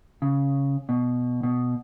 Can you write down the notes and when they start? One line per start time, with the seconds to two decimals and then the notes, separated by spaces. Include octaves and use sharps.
0.22 C#3
0.89 B2
1.43 B2